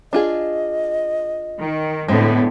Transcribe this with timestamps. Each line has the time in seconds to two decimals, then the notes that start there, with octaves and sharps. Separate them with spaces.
0.13 D4 F4 G#4 D#5
1.58 D#3
2.08 A2 D3 G#3 B3 C4